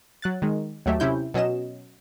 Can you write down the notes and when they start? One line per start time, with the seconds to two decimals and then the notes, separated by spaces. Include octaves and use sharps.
0.22 F#3 F#6 A6
0.42 D#3 G#3
0.86 D#2 F#3 A3 G4 E5
1.00 C3 C#4 E4 G6
1.34 B2 F#3 C#4 D#5 E7